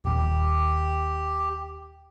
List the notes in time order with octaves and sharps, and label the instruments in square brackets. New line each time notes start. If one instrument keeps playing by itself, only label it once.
[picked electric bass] D#1 D#2 [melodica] G4